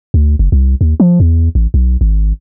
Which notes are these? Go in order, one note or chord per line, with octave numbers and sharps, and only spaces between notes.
D2
F#1
C2
D#2
F3
E2
A1
B1
G#1